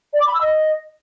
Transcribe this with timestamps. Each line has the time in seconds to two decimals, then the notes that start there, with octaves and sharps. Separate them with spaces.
0.13 D5
0.20 D6
0.27 B5
0.34 E6
0.41 D#5